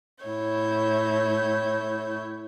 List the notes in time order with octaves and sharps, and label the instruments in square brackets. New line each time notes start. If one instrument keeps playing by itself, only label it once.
[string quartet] A2 E4 C#5 G6